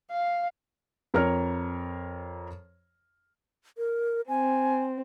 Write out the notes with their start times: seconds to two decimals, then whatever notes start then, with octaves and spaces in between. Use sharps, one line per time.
0.12 F5
1.14 F2 A#4 C#5 F6
3.78 A#4
4.29 C4 G#5